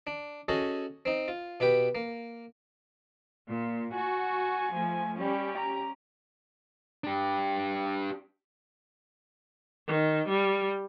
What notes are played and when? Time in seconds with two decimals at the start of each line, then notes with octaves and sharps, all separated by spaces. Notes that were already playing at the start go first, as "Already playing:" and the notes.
0.07 D4
0.48 C#4 F#4 G#4 A4 D#5
1.05 C4 D#4
1.28 F4
1.60 B2 G4 B4 G5
1.95 A#3
3.46 A#2
3.93 F#4 G#5
4.72 F3 A3
5.19 G3 C#4 G4
5.58 A#5
7.04 D4 G4
9.87 D#3
10.29 G3